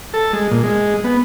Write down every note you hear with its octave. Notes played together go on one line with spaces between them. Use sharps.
A4
G#3
A#2
G#3
B3